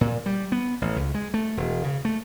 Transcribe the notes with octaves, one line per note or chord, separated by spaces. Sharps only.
A#2
G3
B3
A1
C#2
G#3
A3
E1
C#3
A3